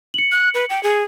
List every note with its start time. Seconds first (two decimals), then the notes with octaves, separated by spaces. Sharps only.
0.14 C#7 F#7
0.32 F#6
0.54 B4
0.70 G5
0.83 G#4